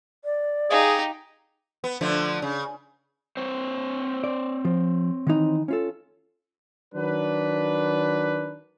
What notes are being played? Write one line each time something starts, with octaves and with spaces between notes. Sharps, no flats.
D5
D#4 G4 G#4 D#5 F5
B3
D3 F3 A3
C#3
C4 C5 C#5
D5
F3
D#3 E3 D#4
C#4 F4 A4
D#3 F#3 D4 A#4 B4